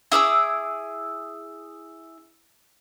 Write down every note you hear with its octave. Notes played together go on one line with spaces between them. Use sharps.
E4 G#4 D6 E6